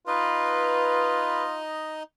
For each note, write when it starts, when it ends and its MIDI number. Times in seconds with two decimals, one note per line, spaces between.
0.07 2.03 63
0.07 1.59 65
0.07 1.43 71
0.07 2.03 75